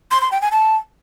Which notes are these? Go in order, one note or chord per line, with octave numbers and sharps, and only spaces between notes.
C6
C6
G5
G#5
A5